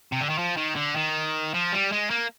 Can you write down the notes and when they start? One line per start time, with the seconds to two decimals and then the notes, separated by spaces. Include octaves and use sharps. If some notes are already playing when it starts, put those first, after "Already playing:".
0.12 C3
0.21 D3
0.30 D#3
0.38 F3
0.57 D#3
0.76 D3
0.96 D#3
1.54 F3
1.72 G3
1.92 G#3
2.10 A#3